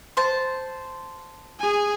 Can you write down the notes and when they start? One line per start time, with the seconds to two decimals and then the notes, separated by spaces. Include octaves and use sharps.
0.17 C5 A5
1.60 G#4 G#5